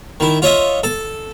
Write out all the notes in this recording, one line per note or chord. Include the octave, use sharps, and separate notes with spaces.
D#3 E4
F4 C#5 D#5 E5
A4 A5